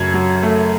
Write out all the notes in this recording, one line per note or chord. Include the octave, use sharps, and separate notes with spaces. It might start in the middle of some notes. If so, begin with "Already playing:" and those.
Already playing: F#2 C#3 F#3 A3 G#6
F#3
A3